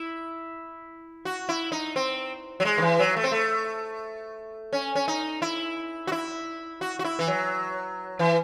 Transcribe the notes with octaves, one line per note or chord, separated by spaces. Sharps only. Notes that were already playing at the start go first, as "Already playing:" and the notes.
Already playing: E4
F#4
E4
D#4
C4
F#3
G#3
D#3
E3
F#3
A3
C4
A3
C#4
C#4
D#4
E4
F#4
E4
F#4
F#4
E4
E3
F#3
E3